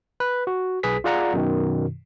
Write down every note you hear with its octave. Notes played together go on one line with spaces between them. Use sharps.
B4
F#4
B1 G#4 B4 B6
F4 G#4 D5 F5 F#5 A#5
F#2 B2 D#3